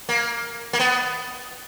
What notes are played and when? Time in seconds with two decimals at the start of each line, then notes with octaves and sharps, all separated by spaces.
0.09 A#3
0.73 A#3
0.80 B3